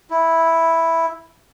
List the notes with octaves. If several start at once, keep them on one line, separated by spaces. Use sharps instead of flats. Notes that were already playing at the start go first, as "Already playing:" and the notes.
E4